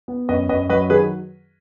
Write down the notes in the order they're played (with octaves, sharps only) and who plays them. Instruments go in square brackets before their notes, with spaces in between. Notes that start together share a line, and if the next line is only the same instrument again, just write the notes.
[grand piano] B3
F#2 B4 D#5
F#2 B4 D#5
F#3 B4 D#5
D#3 G#4 B4